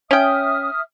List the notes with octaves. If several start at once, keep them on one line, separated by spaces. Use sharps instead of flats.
C#4 E5 G5 D#6 F6